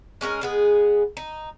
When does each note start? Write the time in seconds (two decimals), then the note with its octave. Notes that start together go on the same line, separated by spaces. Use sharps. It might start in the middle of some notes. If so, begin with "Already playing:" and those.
0.21 G#3 C#4 F#4 A#4
0.41 G#3 B3 G#4
1.17 D#4